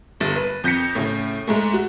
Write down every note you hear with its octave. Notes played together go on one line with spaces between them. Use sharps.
G1 G2 A6
B4
F2 G6 A#6 B6 C#7
A2 C#3
G#2 G#3 A3
F#4